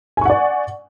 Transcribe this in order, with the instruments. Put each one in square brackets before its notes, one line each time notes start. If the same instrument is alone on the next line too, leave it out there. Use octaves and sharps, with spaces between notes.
[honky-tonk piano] G#5
C#6
F#5
D5